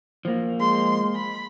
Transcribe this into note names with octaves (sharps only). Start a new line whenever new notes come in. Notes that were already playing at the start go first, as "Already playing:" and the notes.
F3 A#3
G#3 C6
B5